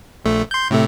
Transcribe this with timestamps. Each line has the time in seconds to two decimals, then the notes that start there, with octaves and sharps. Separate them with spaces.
0.25 A#1 A3
0.51 C6 G6
0.70 A2 C3 A3